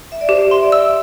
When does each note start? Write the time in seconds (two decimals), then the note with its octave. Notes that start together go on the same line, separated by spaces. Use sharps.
0.12 E5
0.21 D5
0.29 G4 C5
0.51 E5 C6
0.63 D5
0.72 E5 E6